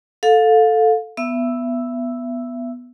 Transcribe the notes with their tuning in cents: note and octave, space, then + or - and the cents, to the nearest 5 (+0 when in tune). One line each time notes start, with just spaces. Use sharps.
A4 +0 F5 +25
B3 +0 E5 +25 E6 +0